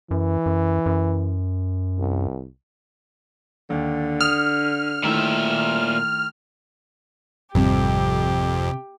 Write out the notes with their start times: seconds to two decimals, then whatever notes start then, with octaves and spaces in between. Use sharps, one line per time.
0.11 F#2 E3
0.46 F#2
0.86 F#2
1.98 C2
3.70 D#2 D3
4.20 D#6 F6
5.04 A#2 D#3 A3 E4 E5
7.55 G#1 F2 C3 G3 C4 G4